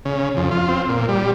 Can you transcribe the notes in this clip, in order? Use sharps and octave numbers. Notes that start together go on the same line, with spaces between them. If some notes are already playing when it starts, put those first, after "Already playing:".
C#3
F2
F4
C4
A#2
G3